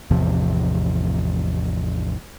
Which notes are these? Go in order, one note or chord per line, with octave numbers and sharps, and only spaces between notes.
A1 E2 C3 F3